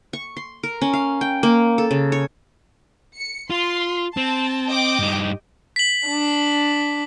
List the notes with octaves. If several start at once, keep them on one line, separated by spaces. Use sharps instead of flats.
C#6
C6
A#4
C#4
F5
G5
A#3
A4
C#3
C#5
C#7
F4 C6
C4 A5
D#5 G5 D6
G2 D#4
B6 F#7
D4